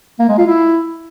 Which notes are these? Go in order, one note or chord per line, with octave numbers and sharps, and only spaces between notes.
A#3
G#3
F4
E4